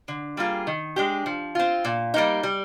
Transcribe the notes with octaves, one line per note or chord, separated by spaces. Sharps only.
D3
G3 A#3 F4 G#4
D#3
G#3 D4 G4
F3
C4 F4
A#2
G3 A#3 D#4
G3